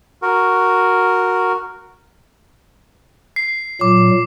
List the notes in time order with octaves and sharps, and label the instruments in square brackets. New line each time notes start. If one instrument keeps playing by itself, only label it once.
[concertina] F#4 A#4
[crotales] C7
[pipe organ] A#2 F#3 [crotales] D6